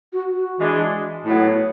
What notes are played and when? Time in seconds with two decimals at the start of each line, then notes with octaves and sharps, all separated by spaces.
0.13 F#4
0.35 F#4
0.58 E3 G#3 D4
1.25 A2 F#3 B3 E4